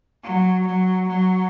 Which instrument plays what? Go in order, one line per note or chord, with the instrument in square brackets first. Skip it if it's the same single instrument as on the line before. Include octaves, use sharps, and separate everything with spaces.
[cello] F#3
F#3
F#3